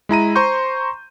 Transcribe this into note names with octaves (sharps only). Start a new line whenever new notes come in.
G#3 E4 A#5 D#7
C5 A#5 C6 C#6 G6